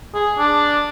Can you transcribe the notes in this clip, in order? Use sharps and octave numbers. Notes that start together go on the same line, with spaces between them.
G#4
D4